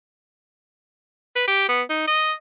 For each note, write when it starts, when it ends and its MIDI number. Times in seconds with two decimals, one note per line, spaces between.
1.36 1.46 71
1.48 1.68 67
1.69 1.82 59
1.90 2.04 63
2.08 2.33 75